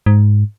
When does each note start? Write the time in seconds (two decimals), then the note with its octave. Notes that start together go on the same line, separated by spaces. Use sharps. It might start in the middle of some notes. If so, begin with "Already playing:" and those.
0.06 G#2